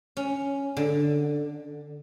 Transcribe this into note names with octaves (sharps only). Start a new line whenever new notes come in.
C#4
D3